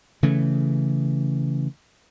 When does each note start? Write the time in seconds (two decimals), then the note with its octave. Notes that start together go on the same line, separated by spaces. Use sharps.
0.23 C#3 E3 A3